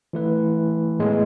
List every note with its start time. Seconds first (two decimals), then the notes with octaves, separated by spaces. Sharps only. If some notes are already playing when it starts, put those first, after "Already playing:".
0.13 E3 A3 E4 B4
0.99 A2 G#3 B3